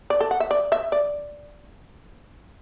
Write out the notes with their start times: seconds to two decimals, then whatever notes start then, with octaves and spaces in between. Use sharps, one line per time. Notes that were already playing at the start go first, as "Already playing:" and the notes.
0.10 D5
0.20 A4
0.31 F#5
0.40 E5
0.51 D5
0.72 E5
0.92 D5